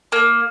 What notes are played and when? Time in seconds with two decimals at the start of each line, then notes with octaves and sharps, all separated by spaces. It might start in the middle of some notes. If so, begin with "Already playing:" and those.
0.12 A#3